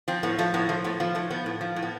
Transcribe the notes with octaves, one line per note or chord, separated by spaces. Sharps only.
F3 C4
A2 B3
F3 A3
A2 B3
F3 A3
A2 B3
F3 B3
A2 A3
F3 B3
A2
F3
A2
B3